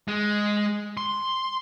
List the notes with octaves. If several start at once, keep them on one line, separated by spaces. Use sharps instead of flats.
G#3
C6